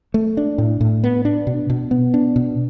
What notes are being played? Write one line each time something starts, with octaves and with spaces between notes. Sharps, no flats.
A3
D4
A2
A2
B3
D4
B2
B2
B3
D4
B2